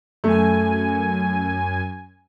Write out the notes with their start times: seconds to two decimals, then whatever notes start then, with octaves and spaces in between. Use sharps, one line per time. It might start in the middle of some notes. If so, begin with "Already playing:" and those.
0.24 F#2 A3 G#5